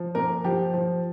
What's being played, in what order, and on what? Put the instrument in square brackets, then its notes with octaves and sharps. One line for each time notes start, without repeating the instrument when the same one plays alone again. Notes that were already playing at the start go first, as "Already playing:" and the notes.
Already playing: [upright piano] F3
A#2 A#4
F3 G4
F3